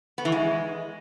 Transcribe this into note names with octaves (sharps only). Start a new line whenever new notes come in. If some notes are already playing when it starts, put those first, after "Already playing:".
B3
E3
G#3